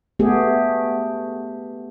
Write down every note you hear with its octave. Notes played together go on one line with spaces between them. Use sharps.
A3 B3 G4 G#4